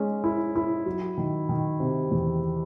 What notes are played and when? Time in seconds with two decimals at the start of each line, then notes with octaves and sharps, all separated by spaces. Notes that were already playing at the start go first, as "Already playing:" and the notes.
Already playing: G#3 C#4
0.24 E4
0.56 E4
0.86 F#3
1.18 D#3
1.49 D#3
1.80 C3
2.11 E2